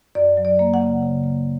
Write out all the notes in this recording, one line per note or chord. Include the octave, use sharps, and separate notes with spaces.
F#2 D5
F#3
D5
A#3
F#5
C#3
C#3
A#3